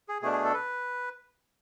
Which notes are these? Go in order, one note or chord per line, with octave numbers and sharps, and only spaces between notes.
G#4
B2 A3 D4 G#4
G#4
A4
B4